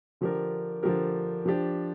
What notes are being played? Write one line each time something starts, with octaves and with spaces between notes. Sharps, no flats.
D3 F3 D4 G4 A#4
D3 F3 D4 G4 A#4
F3 D4 G4